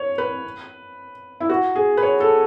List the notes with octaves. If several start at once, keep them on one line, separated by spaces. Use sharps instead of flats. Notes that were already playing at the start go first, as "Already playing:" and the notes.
Already playing: C#5
B4
E4
F#4
G#4
B4
C#5
A4